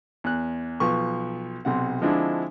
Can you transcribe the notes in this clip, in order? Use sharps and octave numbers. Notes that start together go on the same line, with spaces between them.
E2 F#6
B1 F3 B4 C#6
B1 C3 F#5
D3 F3 G#3 C4 D4 E4